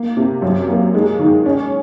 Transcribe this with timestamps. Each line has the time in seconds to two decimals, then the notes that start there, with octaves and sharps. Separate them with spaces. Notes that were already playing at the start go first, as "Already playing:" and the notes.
Already playing: A#3
0.17 C3
0.42 F#2
0.68 A#3
0.94 G#3
1.19 D#3
1.46 C#4